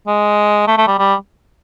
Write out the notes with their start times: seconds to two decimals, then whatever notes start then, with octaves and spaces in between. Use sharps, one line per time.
0.07 G#3
0.67 A3
0.78 A3
0.87 G3
0.99 G3